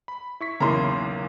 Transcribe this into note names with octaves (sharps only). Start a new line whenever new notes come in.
B5
E4 C#6 B6
B1 E2 C#3 A#3 E4 A#5 C6